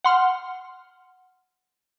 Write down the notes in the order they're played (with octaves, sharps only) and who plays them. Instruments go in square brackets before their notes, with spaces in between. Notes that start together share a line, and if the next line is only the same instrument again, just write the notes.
[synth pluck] F#5 C6 F6